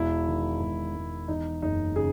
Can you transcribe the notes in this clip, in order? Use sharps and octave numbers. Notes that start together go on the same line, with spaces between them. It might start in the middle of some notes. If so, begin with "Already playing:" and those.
Already playing: E1 E4
D#3
E1
E1
E2 D#4
F#1 D#4
C#3 G#4